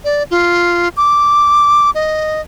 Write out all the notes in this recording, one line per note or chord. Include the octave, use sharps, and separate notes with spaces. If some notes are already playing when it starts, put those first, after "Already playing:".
D5
F4
D6
D#5